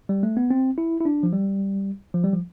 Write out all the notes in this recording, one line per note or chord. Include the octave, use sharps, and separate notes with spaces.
G3
A3
B3
C4
E4
E4
D4
F3
G3
F3
G3
F3